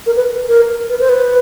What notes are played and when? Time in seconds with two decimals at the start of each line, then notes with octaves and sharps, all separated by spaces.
0.06 A#4
0.16 B4
0.48 A#4
0.90 B4
1.00 C5
1.09 B4